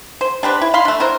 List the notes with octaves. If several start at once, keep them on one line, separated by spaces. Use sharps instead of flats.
C5
D4 G4 B4 C5
E4
F5 B5 C6
A3 D4
D4 E4 A#4 C5